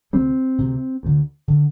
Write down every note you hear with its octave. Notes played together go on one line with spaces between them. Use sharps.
D2 C3 G3 C4
D2 C3
D2 D3
D3